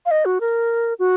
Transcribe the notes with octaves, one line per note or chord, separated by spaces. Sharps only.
F5
D#5
F#4
A#4
F#4